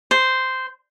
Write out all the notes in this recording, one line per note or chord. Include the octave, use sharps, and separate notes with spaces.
C5